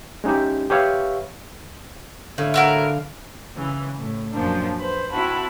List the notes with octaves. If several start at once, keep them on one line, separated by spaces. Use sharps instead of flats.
G#3 C#4 D#4 E4 G4
G4 B4 C#5 E5 F5 C#6
A2 D3 F5
E4 F#4 A#4
C#3 E3
A2
F#2 A#2 F3 A#3 D4
B4 C5
C4 E4 F#4 A5 B5